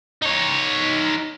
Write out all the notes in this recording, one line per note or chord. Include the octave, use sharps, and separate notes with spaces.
D#4 C#5